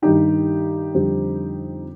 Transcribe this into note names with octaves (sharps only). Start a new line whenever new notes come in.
G2 D#3 G3 D#4 G4
F2 D3 G3 C4